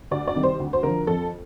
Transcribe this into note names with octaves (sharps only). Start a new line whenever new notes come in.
D2 D5
D5
C3 D#3 G3
C5
D2
C5
D3 F3 A#4
F2 A4